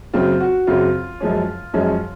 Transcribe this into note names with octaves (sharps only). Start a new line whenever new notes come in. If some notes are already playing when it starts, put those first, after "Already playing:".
F#2 C#3 F#3 C4 F4
F#4
F#2 C#3 F#3 C4 F4
F#2 F3 G#3 C#4
F#2 F3 G#3 C#4